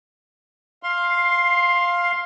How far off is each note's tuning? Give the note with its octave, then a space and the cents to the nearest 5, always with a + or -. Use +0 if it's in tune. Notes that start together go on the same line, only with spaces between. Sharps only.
F5 +0 C6 +15